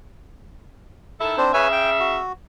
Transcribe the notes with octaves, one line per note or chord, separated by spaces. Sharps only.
D#3 E4 A4 E5
C4 D4 C5
C#3 B4 C#5 E5 G#5
G5
F#4